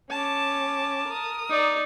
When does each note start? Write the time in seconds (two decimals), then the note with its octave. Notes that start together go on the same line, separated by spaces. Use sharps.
0.11 C#4 A5 D6
1.08 A#4 D#6
1.50 D#4 D5